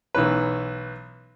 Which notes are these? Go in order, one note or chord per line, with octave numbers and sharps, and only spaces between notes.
B1 E3 C#4 B4